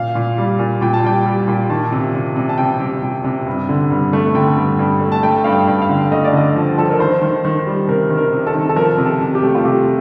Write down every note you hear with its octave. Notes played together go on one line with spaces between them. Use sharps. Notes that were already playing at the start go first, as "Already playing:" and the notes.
Already playing: A#2 F5
A#2
G3
A#2
A#2 G5
A5
G3 G5
G3
A#2
D#3 A5
C3
C3
C3
A5
C3 G5
C3
C3
C3
G2
D3
G2
A3
D3 G5
G2
G2
A3
A5
A3 G5
G2 F5
G5
G2
F5
D3
A3 D#5
D5
D3 D#5
F3
F3 A4
A#4
D#3 C5
D#3
D#3
G3
C3 A#4
D#3
A#4
C3
A4
D#3
A4
F3 A#4
C3
A4
C3
G4
A3
F4
C3 G4